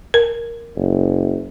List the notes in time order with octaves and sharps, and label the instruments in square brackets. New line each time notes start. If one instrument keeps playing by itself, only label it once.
[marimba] A#4
[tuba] F#1